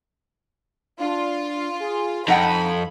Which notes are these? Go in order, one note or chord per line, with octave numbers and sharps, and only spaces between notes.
D4 F4
G#4
F2 D#4 A4 F#5 G5 B5